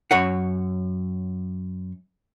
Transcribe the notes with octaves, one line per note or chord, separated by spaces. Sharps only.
F#2 C#5 F#5